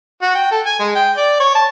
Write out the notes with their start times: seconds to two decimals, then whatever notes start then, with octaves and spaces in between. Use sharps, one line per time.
0.22 F#4
0.35 G5
0.51 A4
0.66 G#5
0.80 G#3
0.95 G5
1.17 D5
1.40 C#5
1.55 A5